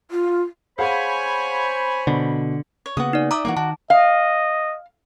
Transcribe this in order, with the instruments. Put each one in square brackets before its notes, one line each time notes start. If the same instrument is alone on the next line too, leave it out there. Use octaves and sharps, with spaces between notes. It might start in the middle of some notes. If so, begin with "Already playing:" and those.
[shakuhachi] F4
[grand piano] G#4 F5 F#5 [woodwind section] C5 B5 [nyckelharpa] C#5 G#5
[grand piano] B2 [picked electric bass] D3
[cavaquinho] C#5
[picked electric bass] C#3 A#3 B3 [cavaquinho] F#4 D#6
[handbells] D#4 D5
[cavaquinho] D5 E5 D#6 [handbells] A#5 D6
[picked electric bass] E3 G3 A#3 [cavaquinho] F#4 A#4 D5
[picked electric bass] D#3 [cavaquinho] F#4 [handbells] A5
[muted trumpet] D#5 [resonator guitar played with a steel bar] F5